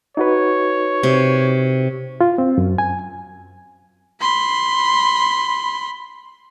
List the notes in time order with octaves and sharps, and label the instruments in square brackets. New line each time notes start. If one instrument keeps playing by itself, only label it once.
[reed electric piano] D#4 F#4 B4 [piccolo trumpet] C#5
[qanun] C3
[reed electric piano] F4
C4
F#2
G#5
[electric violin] B5 C6